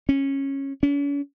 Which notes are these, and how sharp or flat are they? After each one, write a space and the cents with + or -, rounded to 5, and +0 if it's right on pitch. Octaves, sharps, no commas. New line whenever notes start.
C#4 -15
C#4 +40